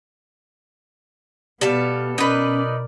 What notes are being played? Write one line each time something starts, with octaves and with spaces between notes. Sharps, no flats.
B2 G3 B3 A4 F5
C#4 D#4 A#4 B4 D5